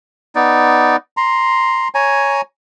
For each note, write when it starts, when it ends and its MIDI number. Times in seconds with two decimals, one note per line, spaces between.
0.35 0.96 59
0.35 0.96 63
0.35 0.96 74
1.17 1.88 82
1.17 1.88 84
1.95 2.41 73
1.95 2.41 80
1.95 2.41 82